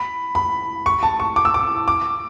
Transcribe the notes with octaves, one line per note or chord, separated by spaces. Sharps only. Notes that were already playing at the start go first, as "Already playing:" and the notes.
Already playing: B5
B5
C#6
A5
C#6
D6
E6
D6
D6